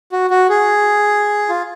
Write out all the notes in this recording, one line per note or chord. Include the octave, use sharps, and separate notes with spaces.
F#4
F#4
G#4
F4